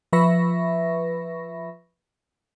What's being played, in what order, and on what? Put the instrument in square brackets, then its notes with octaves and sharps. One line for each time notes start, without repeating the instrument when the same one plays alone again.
[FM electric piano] F3 B4 E5 B5 C#6 A#6